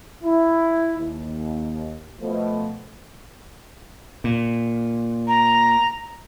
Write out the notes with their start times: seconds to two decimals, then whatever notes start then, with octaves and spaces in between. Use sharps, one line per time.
0.24 E4
0.99 D#2
2.21 B2 F3 A3
4.24 A#2
5.27 A#5